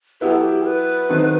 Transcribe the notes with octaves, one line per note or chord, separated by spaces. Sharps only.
F#3 B3 E4 G4 B4
A4
G4
B4
D#3 F#3 C4 D#4 A4